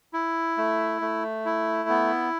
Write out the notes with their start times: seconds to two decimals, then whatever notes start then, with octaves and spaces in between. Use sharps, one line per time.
0.13 E4
0.57 A3
1.02 A3
1.45 E4
1.89 B3